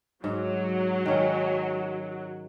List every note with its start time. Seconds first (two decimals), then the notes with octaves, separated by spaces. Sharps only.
0.24 G#2 F#3
1.06 D#3 C#4